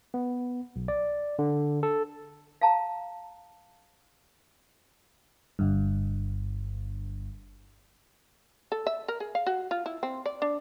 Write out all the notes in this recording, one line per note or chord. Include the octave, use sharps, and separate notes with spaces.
B3
B1
D5
D3
A4
F5 A5 A#5
G1 G2
A4
E5
A#4
G#4
F5
F#4
F4
E4
C4
D5
D4